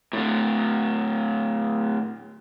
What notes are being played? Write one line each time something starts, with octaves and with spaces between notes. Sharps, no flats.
A2 D3